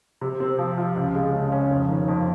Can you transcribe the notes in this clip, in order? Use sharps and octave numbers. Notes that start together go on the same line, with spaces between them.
C3
C4
F3
F4
C#2
G#3
C#3
C#4
F1
D#3
F2